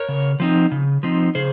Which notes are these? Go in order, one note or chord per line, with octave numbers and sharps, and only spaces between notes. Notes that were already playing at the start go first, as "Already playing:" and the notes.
Already playing: A#4 C#5
C#3
F3 C4 D#4
C#3
F3 C4 D#4
C#3 G#4 C5